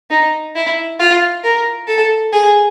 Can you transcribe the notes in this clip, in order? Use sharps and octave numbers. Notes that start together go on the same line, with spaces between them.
D#4
E4
F4
A#4
A4
G#4